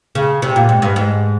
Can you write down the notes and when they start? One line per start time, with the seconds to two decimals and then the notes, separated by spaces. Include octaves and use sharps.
0.15 C#3
0.42 C3
0.56 A#2
0.69 G#2
0.82 G2
0.96 G#2